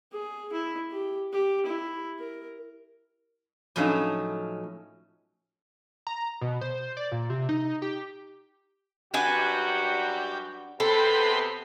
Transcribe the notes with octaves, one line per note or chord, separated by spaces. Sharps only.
G#4
E4
G4
G4
E4
A#4
A2 F3 F#3 A3 C#4 D#4
A#5
B2
C5
D5
A#2
C3
D#4
G4
F#2 G3 D4 F#4 G4 B4 G#5
C3 B3 A4 B4 C5 G5 B5